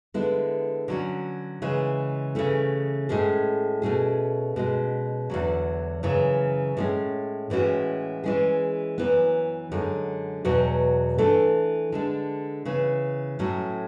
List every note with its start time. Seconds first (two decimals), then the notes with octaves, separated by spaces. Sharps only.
0.14 D3 G#3 B3 E4
0.88 D3 F#3 C#4
1.62 C#3 E3 G#3
2.35 C#3 E3 A3 C#4
3.09 A2 G#3 C#4 G#4
3.82 B2 A3 C#4 G#4
4.56 B2 G#3 C#4
5.30 E2 D3 F#3
6.03 F#2 C#3 E3
6.77 A2 G#3 C#4
7.50 A2 E3 G#3 C#4 F#4
8.24 E3 G#3 C#4 G#4
8.98 F#2 E3 B3
9.72 F#2 D3 G#3
10.45 E2 B2 F#3 B3
11.18 E3 A3 D4 A4
11.92 D3 G#3 D4
12.65 C#3 E3 B3
13.39 A2 F#3 A3 C#4